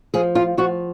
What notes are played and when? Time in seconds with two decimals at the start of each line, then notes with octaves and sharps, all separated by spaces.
0.14 F3 G#4
0.35 F4
0.57 F3 F#4